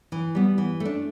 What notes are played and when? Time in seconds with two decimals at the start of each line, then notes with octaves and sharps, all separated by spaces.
0.12 E3
0.35 G3 B3
0.58 E3
0.80 A3
0.85 D4